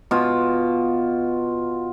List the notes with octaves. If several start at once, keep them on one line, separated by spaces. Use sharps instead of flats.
B2 F4